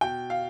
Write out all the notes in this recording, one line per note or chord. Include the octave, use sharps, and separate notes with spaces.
B2 G5
F5